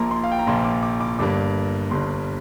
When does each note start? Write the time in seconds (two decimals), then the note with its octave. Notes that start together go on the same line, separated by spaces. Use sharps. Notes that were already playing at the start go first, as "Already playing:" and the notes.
Already playing: A#1 A#2 F3 A#3 A#5 C6
0.11 C6
0.24 F5
0.31 G5
0.39 A#5
0.47 A#1 A#2 F3 A#3 C6
0.64 D6
0.83 D6
1.01 D6
1.19 G1 G2 G3 A#3 D6
1.91 G1 G2 G3 A#3 C6